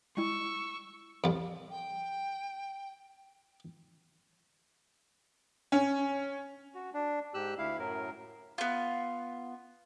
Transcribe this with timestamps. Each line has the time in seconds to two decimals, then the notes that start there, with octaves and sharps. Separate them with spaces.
0.17 G3 G#3 E4 C#6 E6
1.24 C2 F2
1.70 G5
5.72 C#4
6.74 F#4
6.94 D4
7.34 G#2 G4 E6 F#6
7.58 D2 E4 F5
7.79 F#2 A2 F#3 A#4
8.58 B3 F4